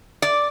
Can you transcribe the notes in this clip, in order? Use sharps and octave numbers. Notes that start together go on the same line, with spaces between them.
D5